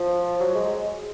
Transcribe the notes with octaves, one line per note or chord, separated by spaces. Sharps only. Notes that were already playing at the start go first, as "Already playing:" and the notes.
Already playing: F3
F#3
G#3